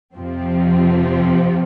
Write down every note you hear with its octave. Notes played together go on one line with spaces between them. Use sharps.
F2 C3 F3 C4